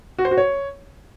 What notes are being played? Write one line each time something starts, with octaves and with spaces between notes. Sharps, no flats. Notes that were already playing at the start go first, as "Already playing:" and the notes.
F#4
C5
F#4
C#5